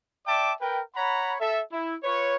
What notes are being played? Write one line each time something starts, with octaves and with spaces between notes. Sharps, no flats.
D5 E5 G5 A5 D6
A#4 B4 G5
C#5 F#5 A#5 B5
A4 E5
E4
F4 B4 C#5